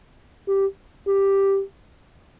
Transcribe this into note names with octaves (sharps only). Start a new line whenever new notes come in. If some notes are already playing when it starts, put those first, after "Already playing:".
G4
G4